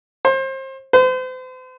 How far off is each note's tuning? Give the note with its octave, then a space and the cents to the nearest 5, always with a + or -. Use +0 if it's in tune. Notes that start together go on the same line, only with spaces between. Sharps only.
C5 +30
C5 -40